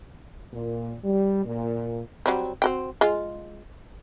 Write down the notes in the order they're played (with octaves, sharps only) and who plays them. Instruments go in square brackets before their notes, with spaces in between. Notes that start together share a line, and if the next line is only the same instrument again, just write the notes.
[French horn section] A#2
G3
A#2
[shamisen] F#3 G3 C4
C4 F#4 G5
G#3 F4